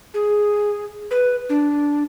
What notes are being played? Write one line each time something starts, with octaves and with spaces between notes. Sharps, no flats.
G#4
B4
D4